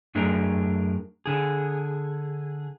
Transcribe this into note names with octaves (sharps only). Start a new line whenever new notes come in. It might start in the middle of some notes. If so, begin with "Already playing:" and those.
F#2 A3 D4 G#4 A#4
D3 G#4